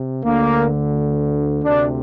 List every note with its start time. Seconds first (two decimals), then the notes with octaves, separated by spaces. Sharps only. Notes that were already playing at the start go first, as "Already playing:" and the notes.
Already playing: C3
0.24 D2 D3 A#3
1.64 D2 C3 D4